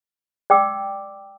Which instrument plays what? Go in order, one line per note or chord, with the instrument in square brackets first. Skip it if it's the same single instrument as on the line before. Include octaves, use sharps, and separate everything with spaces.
[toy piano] D5 G5 D6 E6